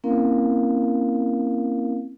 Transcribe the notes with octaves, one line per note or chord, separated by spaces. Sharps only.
A#3 C4 C#4 E4 A#4 F5